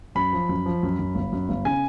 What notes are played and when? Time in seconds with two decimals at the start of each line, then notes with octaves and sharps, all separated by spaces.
0.15 F#2 B5
0.33 F3
0.49 F#2
0.66 F3
0.83 F#2
0.99 F#2
1.15 G1
1.32 F#2
1.49 G1
1.65 C#3 G#5